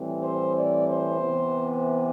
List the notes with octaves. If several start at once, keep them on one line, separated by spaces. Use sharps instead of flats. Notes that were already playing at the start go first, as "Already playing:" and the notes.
Already playing: A2 E3 G3 C4
C5
D5
C5
C3 E3 B3